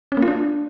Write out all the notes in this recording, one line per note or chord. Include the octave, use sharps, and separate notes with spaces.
C#4
A#3
F4
D4